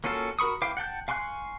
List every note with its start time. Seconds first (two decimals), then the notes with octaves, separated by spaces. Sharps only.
0.04 A#3 C#4 F4 F#4 A4
0.39 F#4 A#4 B5 C#6 D#6
0.62 E4 B4 F5 G5 D6
0.77 F#5 G5 A5 G6
1.08 F5 G#5 C6 C#6 F#6